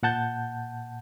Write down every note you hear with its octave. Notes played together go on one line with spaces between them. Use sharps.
A#2 F#5 A5 G6